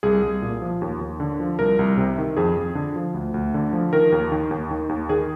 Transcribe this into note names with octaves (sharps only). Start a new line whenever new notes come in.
C2 G#4
C2
A#2
F3
D#2
D#2
D3
F3
C2 A#4
C2
C3
D#3
F2 G#4
F2
D3
F3
D2
D2
D3
F3
D#3 A#4
D#2
D#3
D#2
D#3
D#2
D#3 G#4